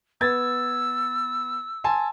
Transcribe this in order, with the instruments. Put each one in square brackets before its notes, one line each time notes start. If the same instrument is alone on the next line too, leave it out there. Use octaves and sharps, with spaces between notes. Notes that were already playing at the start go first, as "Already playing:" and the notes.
[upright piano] B3 G#6 A6 [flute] E6
[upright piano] G#5 A5 C6